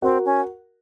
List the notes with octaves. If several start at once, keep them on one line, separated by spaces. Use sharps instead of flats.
C4 F#4 A#4
C#4